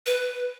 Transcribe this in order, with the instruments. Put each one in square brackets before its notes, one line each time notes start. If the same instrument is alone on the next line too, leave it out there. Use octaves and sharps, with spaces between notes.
[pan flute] B4